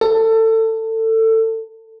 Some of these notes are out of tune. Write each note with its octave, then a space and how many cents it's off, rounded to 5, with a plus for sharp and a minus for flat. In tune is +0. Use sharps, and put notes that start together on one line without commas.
A4 +25